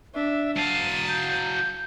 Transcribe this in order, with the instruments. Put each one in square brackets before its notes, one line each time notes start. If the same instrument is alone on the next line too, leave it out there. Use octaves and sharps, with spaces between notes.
[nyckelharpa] D4 [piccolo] E5
[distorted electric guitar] F#3 F5 [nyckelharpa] A5 [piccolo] D#7
[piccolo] G6